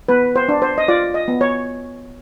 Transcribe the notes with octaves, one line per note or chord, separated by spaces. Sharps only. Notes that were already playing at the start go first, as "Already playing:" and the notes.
B3 B4
C5
D4
C5
D#5
F4 D5
D#5
B3
C#5